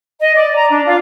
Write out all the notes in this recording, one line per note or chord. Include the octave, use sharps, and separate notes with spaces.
D#5
D5
A#5
D4
F4